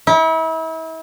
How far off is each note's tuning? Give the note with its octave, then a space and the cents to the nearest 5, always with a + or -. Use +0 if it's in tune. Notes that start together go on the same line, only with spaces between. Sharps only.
E4 -35